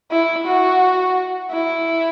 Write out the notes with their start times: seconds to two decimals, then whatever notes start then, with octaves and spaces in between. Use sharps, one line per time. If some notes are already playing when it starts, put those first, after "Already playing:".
0.11 E4
0.46 F#4
1.52 E4